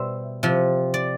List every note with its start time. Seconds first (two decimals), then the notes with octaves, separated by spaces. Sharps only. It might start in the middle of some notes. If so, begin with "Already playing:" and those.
Already playing: B2 G3 C5 E5
0.43 C3 F3
0.94 D5